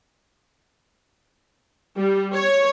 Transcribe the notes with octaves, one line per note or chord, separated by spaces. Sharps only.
G3
C#5